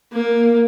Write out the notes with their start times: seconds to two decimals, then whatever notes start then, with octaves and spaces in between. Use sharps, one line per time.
0.13 A#3